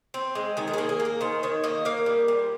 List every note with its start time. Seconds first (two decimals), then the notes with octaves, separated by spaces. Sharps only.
0.14 C4
0.35 G#3
0.57 D#3 G#4
0.68 A#4
0.74 A#3 G#4
0.89 G#4
1.00 A#3
1.05 A#4
1.21 D#3 C5
1.43 D#3 C#5
1.64 A#3 D#5
1.85 A#3 F5
2.06 G3
2.28 A#2